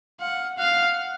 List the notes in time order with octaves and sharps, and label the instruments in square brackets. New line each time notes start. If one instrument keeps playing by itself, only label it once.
[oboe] F5 [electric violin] F#5
[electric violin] F5 [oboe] F#5